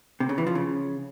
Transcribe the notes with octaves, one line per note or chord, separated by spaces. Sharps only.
C3
C#3
E3
F3
C#3